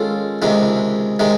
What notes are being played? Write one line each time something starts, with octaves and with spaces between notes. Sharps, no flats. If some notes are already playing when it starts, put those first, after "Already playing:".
Already playing: D#3 G#3 C#4 F4 A4
C#2 C3 D#3 G#3
C3 D#3 G#3